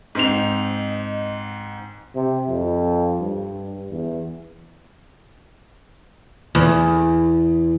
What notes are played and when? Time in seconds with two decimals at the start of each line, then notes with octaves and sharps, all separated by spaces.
0.15 G#2 C4 D#5 F7
2.15 C3
2.49 F2
3.20 G2
3.91 E2
6.55 E2